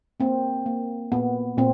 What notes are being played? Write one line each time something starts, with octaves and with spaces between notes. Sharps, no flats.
A#3 C4
A#3
A#2 B3
A#2 C4